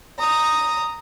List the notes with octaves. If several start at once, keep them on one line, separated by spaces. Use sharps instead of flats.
A#5 D#6